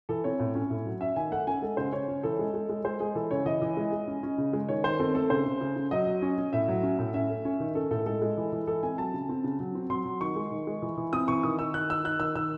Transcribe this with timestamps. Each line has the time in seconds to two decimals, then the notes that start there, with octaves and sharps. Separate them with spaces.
0.09 E3 A4
0.24 C4 C#5
0.40 A2
0.55 C#4
0.70 A2
0.86 F#3
1.01 C#4 E5
1.16 D#3 G#5
1.32 A3 F#5
1.47 C#4 G#5
1.62 G#3 A4
1.77 C#3 C5
1.93 C#3 C#5
2.08 C#4
2.23 E3 A4
2.39 G#3
2.54 G#3
2.69 G#3
2.85 G#3 C5
3.00 G#3 G#4
3.15 E3 A4
3.31 C#3 C#5
3.46 E3 D#5
3.62 E3
3.77 G#3
3.92 G#3
4.07 C#4
4.23 C#4
4.38 C#3
4.53 G#3
4.69 D#3 C#5
4.84 D#3 C5
4.99 C4 A4
5.15 A3 A4
5.30 C#3 C5
5.46 C#3
5.61 C#3
5.76 C#3
5.91 F#3 D#5
6.07 F#3
6.22 C#4
6.38 C#4
6.53 A2 E5
6.68 F#3
6.83 C#4
6.99 A2
7.14 C#4 E5
7.30 A3
7.45 C#4
7.60 D#3
7.75 C#4 A4
7.91 A2 A4
8.06 G#3 A4
8.21 G#3
8.37 E3
8.52 E3
8.67 E3 A4
8.83 C4 G#5
8.98 F#3 A5
9.14 C#3
9.29 C4
9.44 C#3
9.60 F#3
9.75 C4
9.90 F#3 C6
10.05 F#3
10.21 D#3 C#6
10.36 G#3
10.51 D#3
10.67 G#3
10.82 E3
10.97 E3
11.13 C4 D#6
11.28 E3 C#6
11.43 D#3 D#6
11.59 D#3 E6
11.74 D#3 F#6
11.89 D#3 E6
12.04 D#3 F#6
12.20 D#3 E6
12.36 D#3 E6